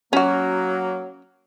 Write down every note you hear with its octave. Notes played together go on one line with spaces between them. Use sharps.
F#3 A#3 C#4 F#4